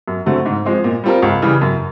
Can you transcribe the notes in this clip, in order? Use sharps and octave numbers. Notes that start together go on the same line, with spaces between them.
F#2
D3 F#3 A3 C4
G#2
F3 G#3 C4
A#2
G3 C4 F4 A#4
C#2
C#3 E3 G3
F#2